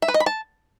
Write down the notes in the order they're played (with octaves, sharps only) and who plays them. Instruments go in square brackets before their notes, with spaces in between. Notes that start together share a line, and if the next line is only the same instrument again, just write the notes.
[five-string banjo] E5
B4
D#5
B5
A5